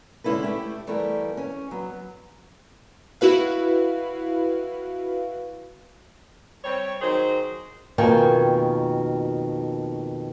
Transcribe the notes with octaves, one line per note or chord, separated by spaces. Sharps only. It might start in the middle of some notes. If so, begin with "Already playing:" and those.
D3 G#3 C#4 E4 A4 B4
A3 E4 G4
E3 G3 A3 B3 A4 A#4
C#4
F#3 B3
E4 F#4 B4 F5
G3 C4 C#5
D#3 F#3 G#4 C5
F2 B2 D#3 A#3 G5 G#5